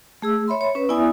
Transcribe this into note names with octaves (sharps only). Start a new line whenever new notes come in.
A3 G#4 E6
C#5 E5 B5 C6
C#5
C#4 B4
B3 E4 D5 E5 G#5 D#6